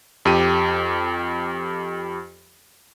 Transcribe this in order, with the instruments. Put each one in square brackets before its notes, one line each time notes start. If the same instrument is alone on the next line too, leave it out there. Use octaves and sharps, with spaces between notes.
[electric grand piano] F2 G4 D#7